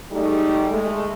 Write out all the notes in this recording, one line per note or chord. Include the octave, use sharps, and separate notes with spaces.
G3 A3 D#4 G#4 A4
G#3 A3